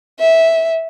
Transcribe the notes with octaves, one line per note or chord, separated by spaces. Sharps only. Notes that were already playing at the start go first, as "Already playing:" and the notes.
E5